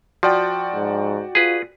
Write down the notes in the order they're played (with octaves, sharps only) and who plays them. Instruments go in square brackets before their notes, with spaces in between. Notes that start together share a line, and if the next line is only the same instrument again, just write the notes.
[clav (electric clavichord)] F3 [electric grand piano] F#4 D5 G5
[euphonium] G#2
[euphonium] F4 [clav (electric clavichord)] G#4 B4